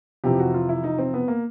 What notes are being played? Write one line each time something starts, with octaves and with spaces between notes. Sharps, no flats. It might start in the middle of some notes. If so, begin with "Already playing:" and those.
F2 C3 E3 G4
F#4
F4
E4
D#4
C4
B3
A#3